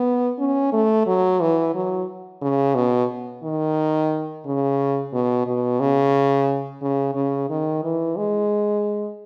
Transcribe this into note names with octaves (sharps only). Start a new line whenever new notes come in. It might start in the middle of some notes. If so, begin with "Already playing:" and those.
Already playing: B3
C#4
A3
F#3
E3
F#3
C#3
B2
D#3
C#3
B2
B2
C#3
C#3
C#3
D#3
E3
G#3